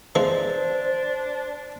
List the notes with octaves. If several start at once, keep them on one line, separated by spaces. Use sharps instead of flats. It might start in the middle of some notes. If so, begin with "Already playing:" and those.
E3 F3 G#3 D4 C5